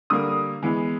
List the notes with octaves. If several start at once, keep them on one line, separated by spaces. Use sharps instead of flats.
D3 G3 A#3 D#6
E3 G#3 B3